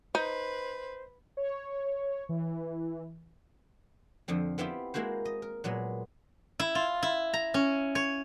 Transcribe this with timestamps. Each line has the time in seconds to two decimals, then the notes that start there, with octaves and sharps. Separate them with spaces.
0.15 D#4 B4 C5
1.37 C#5
2.29 E3
4.28 F2 D3 F3 C4
4.58 B3 C4 E4 F4 G4
4.94 G#3 A#3 E4 F#4 C5
5.25 D#5
5.42 A#4
5.64 A#2 F#3 G#3 B3
6.59 E4
6.75 F4
7.03 E4
7.34 A#5
7.54 C#4
7.95 C#5